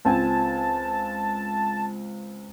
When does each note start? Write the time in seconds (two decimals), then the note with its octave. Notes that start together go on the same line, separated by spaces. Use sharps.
0.05 C#2 C4 G#5 A5